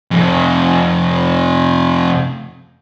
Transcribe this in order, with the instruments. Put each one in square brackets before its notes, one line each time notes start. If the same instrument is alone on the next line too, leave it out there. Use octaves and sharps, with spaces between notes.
[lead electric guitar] F2 C3